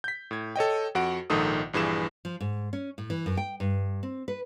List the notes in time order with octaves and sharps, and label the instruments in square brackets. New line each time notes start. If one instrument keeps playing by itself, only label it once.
[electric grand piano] G6 B6
A2 G#6
A4 C#5 D#5 G5
F2 F#4 F#5 D7
A#1 G#2 D#3 A4 D#6
A#1 G2 E3 G#4 E7
[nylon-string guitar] F3
G#2
C#4
A2
E3
F#2
G5
G2
C4
B4